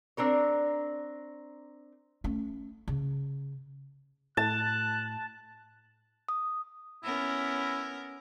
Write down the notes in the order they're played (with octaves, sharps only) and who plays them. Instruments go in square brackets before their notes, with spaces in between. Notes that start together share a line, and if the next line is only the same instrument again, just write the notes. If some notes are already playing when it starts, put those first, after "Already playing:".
[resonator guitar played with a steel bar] C4 D4 A#4 C#5
[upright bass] A3 C#4
C#3
[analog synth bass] A2 [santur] A5 [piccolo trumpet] F#6
[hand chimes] D#6
[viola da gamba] B3 C#4 A#4 [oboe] E4